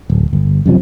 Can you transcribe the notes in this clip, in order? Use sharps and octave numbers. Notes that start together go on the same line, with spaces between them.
D1
G1
F#2 C3 F3